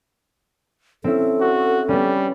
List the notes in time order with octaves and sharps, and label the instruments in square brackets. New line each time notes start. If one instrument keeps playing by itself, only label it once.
[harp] C4 C#4 E4 [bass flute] A4
[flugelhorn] F#4
[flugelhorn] G3 [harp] B3 C#4